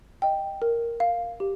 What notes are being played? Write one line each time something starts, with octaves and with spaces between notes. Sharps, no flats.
D#5 G5
A#4
F5
G4